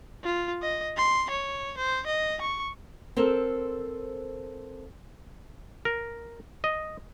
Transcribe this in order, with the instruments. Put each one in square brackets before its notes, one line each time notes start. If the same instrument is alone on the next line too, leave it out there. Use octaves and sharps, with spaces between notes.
[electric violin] F4
D#5
C6
C#5
C5
D#5
C#6
[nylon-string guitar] C4 A4 A#4 C5
[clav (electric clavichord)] A#4
D#5